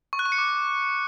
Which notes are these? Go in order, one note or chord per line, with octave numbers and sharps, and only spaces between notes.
C#6
F#6
C#6
C#7
D6